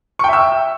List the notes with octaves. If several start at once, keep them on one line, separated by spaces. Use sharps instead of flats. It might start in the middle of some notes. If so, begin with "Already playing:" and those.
E5 G5 C#6 E6